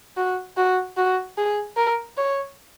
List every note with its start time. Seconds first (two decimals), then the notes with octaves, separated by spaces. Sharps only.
0.17 F#4
0.57 F#4
0.97 F#4
1.38 G#4
1.77 A#4
2.17 C#5